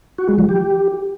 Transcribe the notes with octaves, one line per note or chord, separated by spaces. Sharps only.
F#4
G#3
F3
G4